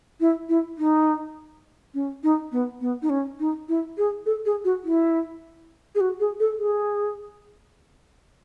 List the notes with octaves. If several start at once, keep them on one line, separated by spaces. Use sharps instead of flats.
E4
E4
D#4
C#4
D#4
B3
B3
D#4
C#4
D#4
E4
G#4
A4
G#4
F#4
E4
G#4
F#4
G#4
A4
G#4